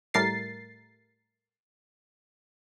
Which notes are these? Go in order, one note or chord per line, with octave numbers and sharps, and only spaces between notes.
A2 G3 A3 A#4 A6 C7